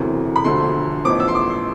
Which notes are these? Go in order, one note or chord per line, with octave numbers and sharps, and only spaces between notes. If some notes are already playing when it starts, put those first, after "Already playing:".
Already playing: E1 D2 C3 E3
B5
E1 D2 D3 F3 C6
A1 A2 F3 B3 D6
E6
C6
D6
C6